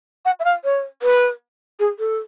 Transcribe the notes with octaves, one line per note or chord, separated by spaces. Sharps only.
F#5
E5
F5
C#5
B4
G#4
A4